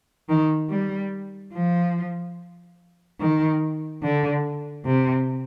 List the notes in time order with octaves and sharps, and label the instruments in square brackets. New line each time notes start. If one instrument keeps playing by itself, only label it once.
[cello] D#3
G3
F3
D#3
D3
C3